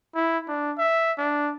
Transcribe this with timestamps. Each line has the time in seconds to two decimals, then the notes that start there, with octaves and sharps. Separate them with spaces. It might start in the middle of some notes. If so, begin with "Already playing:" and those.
0.15 E4
0.48 D4
0.78 E5
1.18 D4